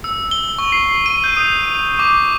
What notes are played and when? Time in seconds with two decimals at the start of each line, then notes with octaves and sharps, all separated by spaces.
0.04 E6
0.31 G7
0.58 C#6
0.72 C7
1.06 D#7
1.24 G6
1.37 D#6
1.99 D6